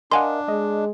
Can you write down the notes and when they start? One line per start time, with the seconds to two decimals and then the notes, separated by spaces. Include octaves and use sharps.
0.12 D4 A#4 D#5 F5 F#5 G#5 C6
0.48 G#3 D#5